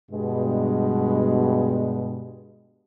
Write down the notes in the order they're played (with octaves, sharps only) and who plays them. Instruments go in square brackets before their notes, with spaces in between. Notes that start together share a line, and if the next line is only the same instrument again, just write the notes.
[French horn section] G2 B2 G#3